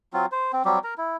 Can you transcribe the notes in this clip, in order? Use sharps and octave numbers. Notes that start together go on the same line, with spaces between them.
F#3 C4 F4
C5
C4
F#3 G3 C4 G4
A#4 A#5
E4